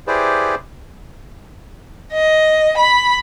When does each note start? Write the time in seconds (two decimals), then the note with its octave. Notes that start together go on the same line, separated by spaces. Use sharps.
0.07 E4 G4 G#4 B4 C5 D5
2.12 D#5
2.78 B5